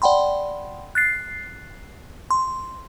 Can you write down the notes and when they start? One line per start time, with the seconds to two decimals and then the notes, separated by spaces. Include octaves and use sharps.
0.02 D5 F#5 G5 B5 C6
0.95 F#6 A6 C7
2.31 C6